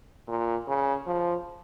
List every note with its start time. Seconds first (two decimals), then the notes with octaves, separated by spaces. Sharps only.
0.28 A#2
0.68 C#3
1.07 F3